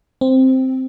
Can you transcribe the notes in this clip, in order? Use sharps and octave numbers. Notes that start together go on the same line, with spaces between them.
C4